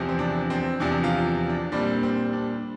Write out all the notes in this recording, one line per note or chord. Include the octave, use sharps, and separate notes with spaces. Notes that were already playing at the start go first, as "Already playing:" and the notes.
Already playing: E2 C3 F3
C4
D4
C4
E2 C3 F3 D4
F4
D4
A#2 G3 C4 D4
C4
D4